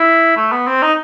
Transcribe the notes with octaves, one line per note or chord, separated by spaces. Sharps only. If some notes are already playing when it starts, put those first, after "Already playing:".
Already playing: E4
A3
B3
C4
D#4